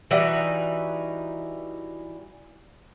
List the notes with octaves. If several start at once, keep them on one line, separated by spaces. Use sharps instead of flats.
E3 G3 D#4 F#4